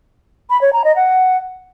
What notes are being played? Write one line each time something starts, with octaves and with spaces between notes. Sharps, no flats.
B5
C#5
A#5
D#5
F#5